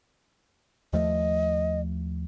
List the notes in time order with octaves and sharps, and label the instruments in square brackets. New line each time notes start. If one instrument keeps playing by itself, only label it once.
[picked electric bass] D#2 F3 A3 [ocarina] D#5